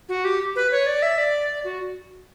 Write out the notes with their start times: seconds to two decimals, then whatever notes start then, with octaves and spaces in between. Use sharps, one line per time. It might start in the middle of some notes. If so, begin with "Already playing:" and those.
0.09 F#4
0.25 G4
0.56 B4
0.72 C#5
0.86 D5
1.02 E5
1.18 D5
1.64 F#4